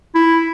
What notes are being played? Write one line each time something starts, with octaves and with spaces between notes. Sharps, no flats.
E4